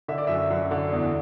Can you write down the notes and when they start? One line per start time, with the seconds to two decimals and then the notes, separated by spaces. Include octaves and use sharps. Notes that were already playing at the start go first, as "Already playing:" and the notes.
0.08 D3 E5
0.18 D5
0.27 F#2 E5
0.50 F#2
0.71 D3
0.92 E2